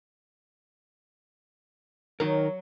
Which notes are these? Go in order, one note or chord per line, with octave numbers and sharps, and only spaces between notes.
D#3 F#3 D#4 A#4